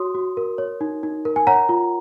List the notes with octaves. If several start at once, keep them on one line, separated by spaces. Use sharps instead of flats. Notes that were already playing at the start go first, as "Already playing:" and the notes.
Already playing: F#4 C#5 C6 D#6
F#4
A#4
C#5
D#4
D#4
A#4
G#5
C#5 F#5 A#5
F4